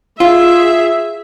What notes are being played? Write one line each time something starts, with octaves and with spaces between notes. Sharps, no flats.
F4 G#4 E5